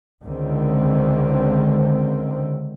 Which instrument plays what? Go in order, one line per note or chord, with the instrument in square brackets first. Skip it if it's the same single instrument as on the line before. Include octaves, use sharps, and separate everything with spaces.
[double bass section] C#2 D3 D#3 C4